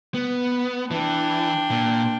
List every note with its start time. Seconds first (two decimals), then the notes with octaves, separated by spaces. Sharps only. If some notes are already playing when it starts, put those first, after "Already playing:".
0.15 B3
0.91 E3 D4 G5
1.71 A#2